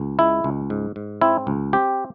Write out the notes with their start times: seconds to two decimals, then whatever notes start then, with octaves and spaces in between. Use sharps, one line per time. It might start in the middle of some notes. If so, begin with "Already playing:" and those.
Already playing: C#2
0.19 G#3 E4
0.44 C#2
0.70 G#2
0.96 G#2
1.21 C4 E4
1.47 C#2
1.73 C4 G4